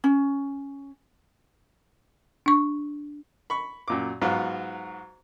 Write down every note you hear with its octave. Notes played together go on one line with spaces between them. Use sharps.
C#4
D4 C#6
B5 C#6
F#2 A#2 D6
G#2 F#3 B3 F4